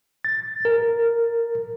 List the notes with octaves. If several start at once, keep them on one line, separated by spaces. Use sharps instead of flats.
A6
A#4